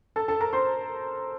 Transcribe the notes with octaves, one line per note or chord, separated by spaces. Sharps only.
A4 A5
A4 A5
A#4 A#5
C5 C6